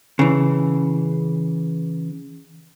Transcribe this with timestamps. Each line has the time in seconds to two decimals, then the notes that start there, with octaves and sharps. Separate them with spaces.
0.19 C#3 E3